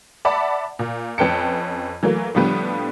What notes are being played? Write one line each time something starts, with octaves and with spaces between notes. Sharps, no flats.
D5 E5 F#5 A5 B5
A#2
F2 C#4 B4 G5 A5 C#7
E3 F#3 A3 A#3
A2 D3 F3 G3 B3